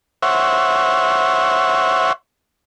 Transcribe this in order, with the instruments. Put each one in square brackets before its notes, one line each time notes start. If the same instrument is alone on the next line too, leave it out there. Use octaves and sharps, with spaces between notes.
[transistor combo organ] C5 C#5 E5 F#5